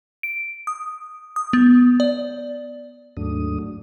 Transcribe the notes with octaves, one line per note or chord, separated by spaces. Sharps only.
D7
D#6
D#6
B3
D5
D#2 G#2 F#3 A3 D4 D#6